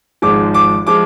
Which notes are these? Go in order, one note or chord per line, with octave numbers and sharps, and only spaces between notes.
G#1 G#2 F3 G#3 D6
D6
F3 G#3 D6